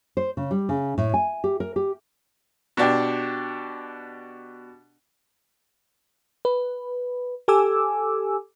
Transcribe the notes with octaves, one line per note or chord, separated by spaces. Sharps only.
C5
C#3
G3
C#3
A2
G#5
G4
A#4
G4
B2 D4 G4
B4
G4 A4 G#5 D6 E6